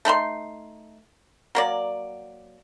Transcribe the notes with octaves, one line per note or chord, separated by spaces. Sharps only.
A3 D#4 B5 C6
F#3 A#3 D5